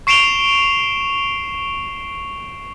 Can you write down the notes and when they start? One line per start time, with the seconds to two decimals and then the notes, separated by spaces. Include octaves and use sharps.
0.07 C#6 C7 D7 E7 F7 G7